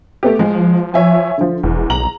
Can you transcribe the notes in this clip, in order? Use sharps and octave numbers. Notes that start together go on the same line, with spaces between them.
A3 B3 G4
F3 G#3
C#5 E5 G#5
D3 F3
E1 E2
B1 A#5 F#7